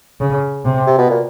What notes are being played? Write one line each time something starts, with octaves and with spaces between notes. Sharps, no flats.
C#3
C3
C3
B2
A#2